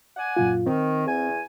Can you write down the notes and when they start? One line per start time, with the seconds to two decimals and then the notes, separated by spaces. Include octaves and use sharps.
0.17 D5 F#5 G#5
0.36 F#2 A#2 F4
0.66 D#3 C4
1.06 E2 G#5